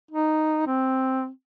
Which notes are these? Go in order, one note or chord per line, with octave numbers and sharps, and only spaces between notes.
D#4
C4